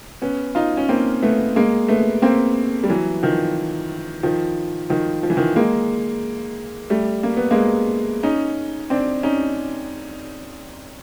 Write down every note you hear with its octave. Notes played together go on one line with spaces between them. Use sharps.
B3 C#4
D#4 F4
C#4
A#3 C4
A3 B3
G#3 A#3
A3 B3
A#3 C4
G3
E3 F#3
D#3 F3
D#3 F3
D#3 F3
F3
E3
D#3 F3
G#3 A#3
G3 A3
A#3
B3
G#3 A#3
C#4 D#4
C4 D4
C#4 D#4